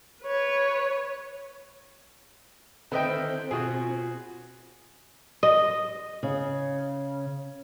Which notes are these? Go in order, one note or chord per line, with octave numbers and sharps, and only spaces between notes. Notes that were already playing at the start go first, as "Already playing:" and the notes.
B4 C#5
D3 D#3 C4 E4 B4 C5 D#5 G5
B2 F4 F#4 G#4
D#5
C#3